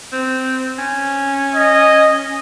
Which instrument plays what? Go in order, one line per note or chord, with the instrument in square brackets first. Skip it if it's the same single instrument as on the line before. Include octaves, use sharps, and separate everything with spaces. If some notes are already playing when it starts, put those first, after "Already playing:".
[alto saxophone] C4
C#4
[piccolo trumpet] D#5